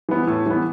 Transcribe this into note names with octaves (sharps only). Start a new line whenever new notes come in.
E3 B3
A2
E3 B3